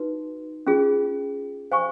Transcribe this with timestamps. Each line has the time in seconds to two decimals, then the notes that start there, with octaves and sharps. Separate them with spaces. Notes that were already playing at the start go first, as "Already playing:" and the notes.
Already playing: D#4 F#4 B4
0.67 C#4 F4 G#4
1.71 C5 F5 G#5 C#6